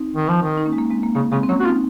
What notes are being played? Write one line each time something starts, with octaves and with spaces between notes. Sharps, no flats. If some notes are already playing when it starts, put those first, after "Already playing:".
Already playing: C4 D#4
D#3
F3
D#3
D#4
A#3 C#4
G#3
A#3
G#3 C4
A#3
C#3 A#3
C#3 G#3 C4
C4
F#3 A#3 C#4
F#4
C4 D#4 F4